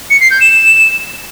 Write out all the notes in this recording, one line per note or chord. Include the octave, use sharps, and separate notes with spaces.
C#7
C7
G6
E7